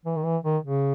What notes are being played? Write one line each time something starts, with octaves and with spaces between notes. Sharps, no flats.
E3
D#3
E3
D#3
C#3